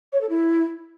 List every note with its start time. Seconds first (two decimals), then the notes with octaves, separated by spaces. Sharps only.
0.13 C#5
0.21 A4
0.29 E4